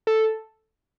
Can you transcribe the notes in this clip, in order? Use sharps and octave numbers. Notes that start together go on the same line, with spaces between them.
A4